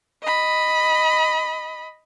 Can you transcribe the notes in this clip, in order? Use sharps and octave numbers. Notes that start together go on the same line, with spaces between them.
D#5 B5